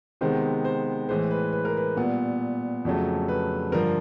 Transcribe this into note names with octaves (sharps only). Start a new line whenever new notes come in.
C3 D#3 G#3 B3 C5
C5
A2 E3 G#3 C5
B4
B4
A#4
B4
A#2 G3 B3
F2 C#3 F#3 A3
B4
G2 D3 F3 A#4